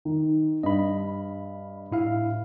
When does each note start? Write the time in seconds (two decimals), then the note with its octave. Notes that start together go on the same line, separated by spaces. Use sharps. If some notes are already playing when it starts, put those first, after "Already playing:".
0.05 D#3
0.63 G2 D#5 B5
1.91 A2 E4 F5